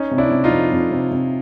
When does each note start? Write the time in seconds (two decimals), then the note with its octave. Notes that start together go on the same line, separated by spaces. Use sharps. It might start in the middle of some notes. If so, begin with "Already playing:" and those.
Already playing: C#4 D#4
0.11 C3
0.18 D4 E4
0.31 C3
0.44 D#4 F4
0.50 F2
0.72 F2
0.91 C3
1.11 C3